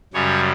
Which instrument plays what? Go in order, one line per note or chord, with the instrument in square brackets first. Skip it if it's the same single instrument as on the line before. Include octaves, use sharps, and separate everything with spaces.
[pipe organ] F#2 C#3 G3 C#5